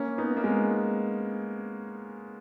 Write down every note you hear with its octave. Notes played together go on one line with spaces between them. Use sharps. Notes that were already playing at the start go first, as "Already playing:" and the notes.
Already playing: A#3 C#4
B3 D#4
A#3
G#3 B3